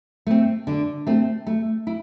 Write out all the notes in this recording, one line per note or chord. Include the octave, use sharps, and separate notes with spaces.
A3 C4
D3
A3 C4
A3
E4